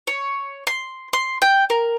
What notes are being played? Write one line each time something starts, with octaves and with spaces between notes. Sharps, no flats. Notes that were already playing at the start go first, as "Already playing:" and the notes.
C#5
C6
C6
G5
A#4